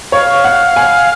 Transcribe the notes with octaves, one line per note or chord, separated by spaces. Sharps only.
C#5 F5
F#5
G#5